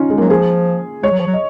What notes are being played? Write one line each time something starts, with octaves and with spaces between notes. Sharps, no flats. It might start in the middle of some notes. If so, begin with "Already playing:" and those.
Already playing: C#4 D#4 F4
G#3
F#3 A#3
F3 G#4
G#3 C#5
F#3
F3
F#3
D#5